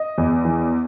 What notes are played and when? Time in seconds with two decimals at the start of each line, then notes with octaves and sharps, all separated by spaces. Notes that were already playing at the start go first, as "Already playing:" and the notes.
Already playing: D#5
0.18 E2
0.45 E3